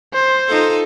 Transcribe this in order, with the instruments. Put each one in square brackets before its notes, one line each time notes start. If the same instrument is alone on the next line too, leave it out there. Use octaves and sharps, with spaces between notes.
[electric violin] C5
[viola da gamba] D#4 F4 A4